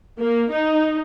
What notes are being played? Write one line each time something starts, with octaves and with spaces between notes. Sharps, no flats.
A#3
D#4